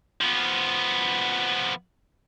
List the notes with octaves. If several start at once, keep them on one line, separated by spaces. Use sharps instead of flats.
F3 B3